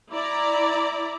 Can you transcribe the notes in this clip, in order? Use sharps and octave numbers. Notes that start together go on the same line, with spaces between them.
E4 D5 A#5